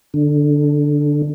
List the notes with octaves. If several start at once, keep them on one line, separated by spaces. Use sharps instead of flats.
D3